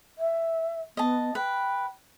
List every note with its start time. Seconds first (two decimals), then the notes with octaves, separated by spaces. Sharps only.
0.18 E5
0.97 B3 D#5 A5
1.35 B4 G5